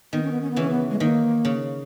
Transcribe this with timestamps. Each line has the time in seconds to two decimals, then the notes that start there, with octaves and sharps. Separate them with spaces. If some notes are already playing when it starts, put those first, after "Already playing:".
0.13 D#3 B3
0.22 C#4
0.31 B3
0.41 C#4
0.51 B3
0.56 C#3 E3 C#4
0.70 B3
0.91 G#3
1.00 D#3 A#3
1.45 C#3